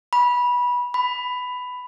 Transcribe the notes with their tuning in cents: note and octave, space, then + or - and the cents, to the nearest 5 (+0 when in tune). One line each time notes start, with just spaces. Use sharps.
B5 -15
B5 +10